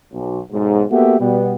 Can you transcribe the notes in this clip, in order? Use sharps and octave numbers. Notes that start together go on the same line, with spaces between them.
B1
B1 G#2
A#3 B3 F#4 G4 A4 E5
B2 G3 B3